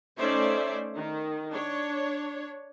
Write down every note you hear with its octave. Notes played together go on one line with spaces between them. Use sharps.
A3 C#4 D#4 C5 D5 E5
D#3
D4 C#5